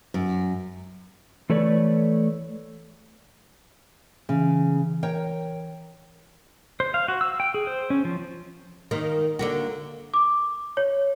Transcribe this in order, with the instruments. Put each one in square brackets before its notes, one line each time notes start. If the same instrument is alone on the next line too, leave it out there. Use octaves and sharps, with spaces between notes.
[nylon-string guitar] F#2
[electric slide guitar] E3 A3 A4 B4 C#5 D5
[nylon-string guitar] C#3 [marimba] E3
[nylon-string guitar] A#4 C#5 G5
[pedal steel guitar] C5
F5
F#4
E6
G5
G#4
C5
C#4
F3
[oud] D#3 A#3
D3 A#3 F#4
[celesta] D6
C#5